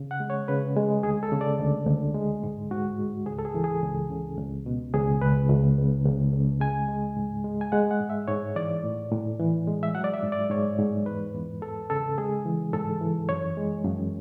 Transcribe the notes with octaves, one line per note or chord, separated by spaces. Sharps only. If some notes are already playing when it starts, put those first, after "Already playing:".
Already playing: C#3
F#5
G#3
C#5
C#3 B4
G#3
D2 G#4
A4
C#3
D5
D2
D2
G#3
G#2
G#2 F#4
G#2
C#2 G#4
A4
G#4
E3
G#4
C#2
C#3
C#2
B2
C#2 G#4
C#2 B4
C#2
C#2
C#2
C#2
G#3 G#5
G#3
G#2
G#3
G#5
G#3 F#5
F#5
G#2
E5
G#2 C#5
E3 D5
A2
A2
E3
G#3
E5
F#3 F#5
D5
E5
G#2
D5
G#2 C#5
G#2
E2 B4
E2
E2 A4
C#3 A4
G#3 G#4
E3
G#2 A4
E3
F#2 C#5
G#3
F#2